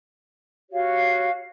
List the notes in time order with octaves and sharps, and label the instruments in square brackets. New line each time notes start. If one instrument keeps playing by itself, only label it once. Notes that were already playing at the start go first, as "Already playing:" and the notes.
[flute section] F#4 G4 C#5 F5